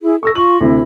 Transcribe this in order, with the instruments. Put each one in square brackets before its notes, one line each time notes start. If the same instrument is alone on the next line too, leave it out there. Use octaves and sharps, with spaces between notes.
[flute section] E4 G#4
[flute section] A4 [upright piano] C#6 E6 A#6
[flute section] F4 C#6 [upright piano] F#7
[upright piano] D2 C3 [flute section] E4